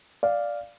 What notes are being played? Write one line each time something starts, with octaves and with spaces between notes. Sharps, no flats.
D5 F5